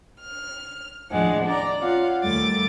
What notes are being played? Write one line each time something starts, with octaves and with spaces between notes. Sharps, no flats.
F6
D#2 A2 F3 G#3 D4 F#5
D4 D5 A#5
C#4 F4 F5 F#5
D#2 G3 A3 D6 A6